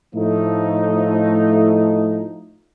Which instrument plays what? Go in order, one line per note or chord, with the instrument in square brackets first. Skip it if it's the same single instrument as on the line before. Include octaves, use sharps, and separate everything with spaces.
[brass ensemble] A2 F3 A3 D#4